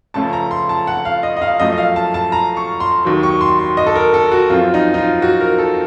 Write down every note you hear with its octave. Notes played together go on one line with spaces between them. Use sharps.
C#2 C#3 F3 A3 C#4 A5
A#5
C6
A5
F#5
F5
D#5
D#5
F5
F#2 F3 A3 D#5
D#5
F5
A5
A5
A#5
C#6
C6
D#2 D#3 F#3
C#6
C6
C6
D#5
A4
A#4
A4
F#4
F#2 F3 C4 F4
D#4
D#4
F4
F#4
A#4
A4